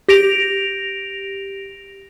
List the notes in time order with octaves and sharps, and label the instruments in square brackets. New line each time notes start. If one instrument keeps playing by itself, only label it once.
[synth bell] G4 A#6 D7 F7